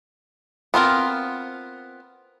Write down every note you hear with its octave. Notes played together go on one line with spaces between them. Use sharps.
B3 C4 F4 A#4